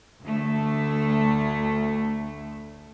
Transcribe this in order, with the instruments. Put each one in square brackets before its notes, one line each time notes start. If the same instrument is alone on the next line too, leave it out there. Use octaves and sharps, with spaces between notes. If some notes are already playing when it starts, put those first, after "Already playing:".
[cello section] D2 A3